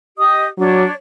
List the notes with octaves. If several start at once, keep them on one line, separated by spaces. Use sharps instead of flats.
G4 D#5 D#6
F#3 D4 C#5